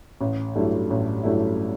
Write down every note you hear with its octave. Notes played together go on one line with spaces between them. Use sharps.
A1
G2 F#3 A3 E4
A1
G2 F#3 A3 E4